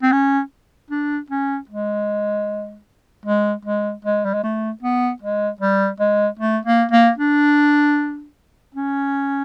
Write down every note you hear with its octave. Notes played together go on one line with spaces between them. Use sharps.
C4
C#4
D4
C#4
G#3
G#3
G#3
G#3
G3
G#3
A3
B3
G#3
G3
G#3
A3
A#3
A#3
D4
C#4